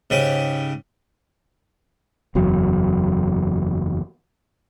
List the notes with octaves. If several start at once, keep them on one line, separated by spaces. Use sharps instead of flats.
G#2 C#3 G4
F#1 E2 F#3